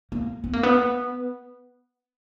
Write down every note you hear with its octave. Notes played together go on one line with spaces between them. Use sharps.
A#3
B3
A#3
B3